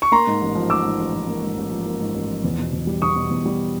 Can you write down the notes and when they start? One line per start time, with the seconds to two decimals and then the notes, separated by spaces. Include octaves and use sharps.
0.02 C#6
0.12 A#3 A#5 C6
0.27 G#2
0.42 A1
0.55 F3
0.70 A#3 D6 E6
0.85 G#2
0.99 A1
1.14 F3
1.28 A#3
1.43 G#2
1.57 A1
1.71 F3
1.86 A#3
2.01 G#2
2.14 A1
2.30 F3
2.44 E2
2.59 B2
2.73 E2
2.87 G3
3.02 E2 C#6 D#6
3.16 B2
3.31 E2
3.45 G3